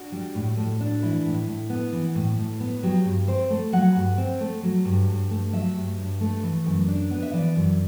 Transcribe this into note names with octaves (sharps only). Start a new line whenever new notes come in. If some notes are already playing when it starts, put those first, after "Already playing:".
Already playing: D4 F#4
G3
A2
A2
D4
E3 E4
A2
A2
B3
E3
A2
A2
B3
F#3 G4
G2
C4 C5
A3
F#3 F#5
G2
C4
A3
F#3
G2
G2
A3
F#3 E5
G2
G2
A3
E3
F#2
D4
B3
E5
E3 D5
F#2